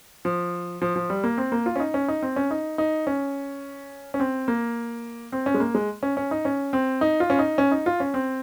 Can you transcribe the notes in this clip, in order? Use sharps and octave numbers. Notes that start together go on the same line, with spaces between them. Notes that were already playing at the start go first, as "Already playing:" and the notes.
F3
F3
F3
G3
A#3
C4
A#3
F4
C#4
D#4
C#4
D#4
C4
C#4
D#4
D#4
C#4
C#4
C4
A#3
C4
C#4
G#3
A#3
G#3
C#4
C#4
D#4
C#4
C4
D#4
F4
C#4
D#4
C#4
D#4
F4
C#4
C4